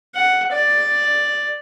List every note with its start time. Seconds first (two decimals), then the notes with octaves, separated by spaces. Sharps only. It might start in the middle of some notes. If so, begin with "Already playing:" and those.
0.15 F#5
0.52 D5